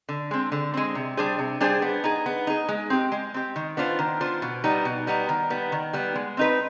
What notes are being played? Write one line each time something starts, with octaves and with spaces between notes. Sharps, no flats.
D3
G#3 C4
D3
G#3 C4
C3
G3 D4 G#4 C5
C3
G3 D4 G#4 C5
B3
D#4 G#4
B3
D#4 G#4
G#3
C4 G4
G#3
C4 G4
D#3
B3 D4 F4 C5
D#3
B3 D4 F4 C5
B2
G3 B3 D#4
B2
G3 B3 D#4
D#3
G3 B3
D#3
G3 B3
G#3
C4 D#4 B4